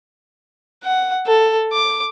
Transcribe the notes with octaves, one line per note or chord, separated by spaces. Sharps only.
F#5
A4
D6